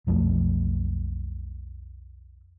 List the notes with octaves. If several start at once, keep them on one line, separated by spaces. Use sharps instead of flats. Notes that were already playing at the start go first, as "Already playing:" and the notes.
B1 F2 F3 A3